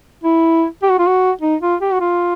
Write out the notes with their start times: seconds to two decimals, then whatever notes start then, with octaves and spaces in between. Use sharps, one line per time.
0.24 E4
0.83 G4
0.91 F#4
0.99 F4
1.07 F#4
1.42 D#4
1.62 F4
1.81 G4
1.93 F#4
2.01 F4